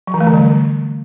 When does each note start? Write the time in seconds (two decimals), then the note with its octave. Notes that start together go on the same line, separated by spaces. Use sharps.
0.07 F#3
0.14 E3
0.21 A3
0.27 D3
0.34 G3